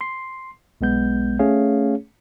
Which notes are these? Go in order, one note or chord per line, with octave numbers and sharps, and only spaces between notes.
C6 C7
B1 G#3 B3 G6
A3 C#4 G#4 C#5 F5